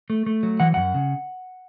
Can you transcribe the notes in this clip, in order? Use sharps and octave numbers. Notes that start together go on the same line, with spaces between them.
A3
A3
F#3
E3 F#5
F#2 F#5
C#3